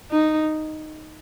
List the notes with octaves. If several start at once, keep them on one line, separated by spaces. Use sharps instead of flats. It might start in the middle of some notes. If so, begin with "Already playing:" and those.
D#4